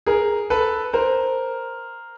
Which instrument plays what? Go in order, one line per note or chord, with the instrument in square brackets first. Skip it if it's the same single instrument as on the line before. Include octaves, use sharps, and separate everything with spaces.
[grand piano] G#4 A#4
A4 B4
A#4 C5